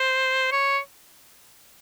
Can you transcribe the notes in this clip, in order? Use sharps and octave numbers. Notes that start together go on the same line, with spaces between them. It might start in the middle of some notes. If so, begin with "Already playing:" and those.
Already playing: C5
C#5